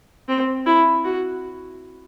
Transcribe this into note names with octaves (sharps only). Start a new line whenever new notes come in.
C4
E4
F#4